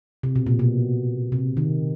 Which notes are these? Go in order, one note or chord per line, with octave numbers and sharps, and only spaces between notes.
C3
B2
A#2
B2
C3
D#3